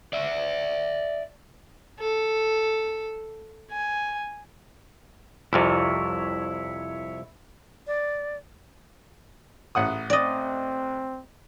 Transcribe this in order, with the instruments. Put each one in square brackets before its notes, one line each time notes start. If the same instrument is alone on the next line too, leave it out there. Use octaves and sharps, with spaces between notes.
[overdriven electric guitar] D5 E5
[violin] A4
G#5
[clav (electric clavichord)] C2 F2 C3 [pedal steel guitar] E4 C#5
[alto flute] D5
[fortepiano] A1 F#5 D#6
[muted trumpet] C4 [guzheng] D5 D#5